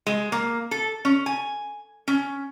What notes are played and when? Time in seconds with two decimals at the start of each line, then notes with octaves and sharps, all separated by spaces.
0.07 G#3
0.32 A#3
0.71 A4
1.05 C#4
1.26 G#5
2.08 C#4